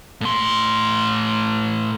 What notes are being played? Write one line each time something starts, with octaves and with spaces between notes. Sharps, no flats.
A2 C6